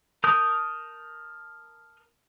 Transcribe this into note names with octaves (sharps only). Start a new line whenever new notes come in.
A#4 A5 D#6 G6